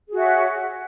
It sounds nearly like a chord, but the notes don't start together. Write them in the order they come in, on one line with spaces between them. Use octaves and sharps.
G#4 F#4 E5 C#5